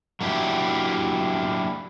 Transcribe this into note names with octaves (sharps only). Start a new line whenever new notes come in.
F#3 A#3 D4 E4 F4 G4